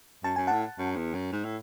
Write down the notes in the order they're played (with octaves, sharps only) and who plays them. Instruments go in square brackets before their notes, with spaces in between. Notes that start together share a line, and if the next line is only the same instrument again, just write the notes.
[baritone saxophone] F#2 [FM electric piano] A5
[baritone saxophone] F#2 [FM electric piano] G#5
[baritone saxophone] A2 [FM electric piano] F#5 A5
[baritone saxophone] F#2
E2
F#2
G#2
A2